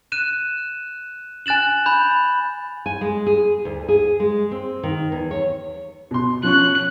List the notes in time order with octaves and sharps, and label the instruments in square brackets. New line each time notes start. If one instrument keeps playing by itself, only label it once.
[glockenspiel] F#6 D#7 E7
G#5 F#6 A6 E7 F#7
B5 G6
[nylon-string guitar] G#5
G#3
G#4
D2
G#4
G#3
C4
D#3
E2
C#5
[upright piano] B2 C6
[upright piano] F3 C#4 C#6 [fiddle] F#6